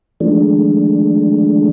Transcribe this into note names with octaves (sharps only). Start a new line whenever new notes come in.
D#3 F3 G#3 A3 D4